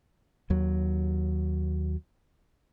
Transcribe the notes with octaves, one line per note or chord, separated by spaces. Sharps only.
D#2 F#3